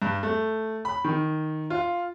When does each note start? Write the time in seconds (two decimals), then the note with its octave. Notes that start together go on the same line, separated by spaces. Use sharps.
0.02 G2
0.23 A3
0.85 B5
1.04 D#3
1.70 F4